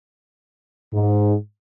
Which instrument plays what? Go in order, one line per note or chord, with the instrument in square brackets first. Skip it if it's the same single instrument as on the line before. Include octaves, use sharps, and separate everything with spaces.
[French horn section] G#2